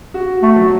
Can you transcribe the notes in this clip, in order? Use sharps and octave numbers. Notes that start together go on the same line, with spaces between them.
F#4
A3
F#3